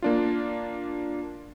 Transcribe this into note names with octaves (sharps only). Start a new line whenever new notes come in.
A#3 D4 F4